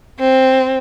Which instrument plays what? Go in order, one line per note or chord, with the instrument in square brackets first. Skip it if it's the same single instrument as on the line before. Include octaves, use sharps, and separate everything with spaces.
[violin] C4